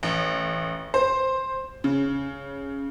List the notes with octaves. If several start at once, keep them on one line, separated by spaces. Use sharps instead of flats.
A1
C5
C#3